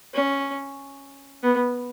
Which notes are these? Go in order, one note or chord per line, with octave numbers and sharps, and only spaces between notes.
C#4
B3